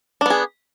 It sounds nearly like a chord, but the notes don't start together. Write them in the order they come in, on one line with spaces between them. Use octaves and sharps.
D4 B3 G#4